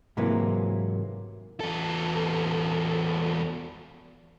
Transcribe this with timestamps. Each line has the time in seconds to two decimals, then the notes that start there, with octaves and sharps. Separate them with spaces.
0.17 G#2 C3 E3 F#3 A#3
1.61 E2 A4